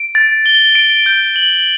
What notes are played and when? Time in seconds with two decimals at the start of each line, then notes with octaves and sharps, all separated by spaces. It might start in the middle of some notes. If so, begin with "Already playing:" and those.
Already playing: D7
0.15 A6
0.46 G7
0.75 D7
1.06 G6
1.36 F#7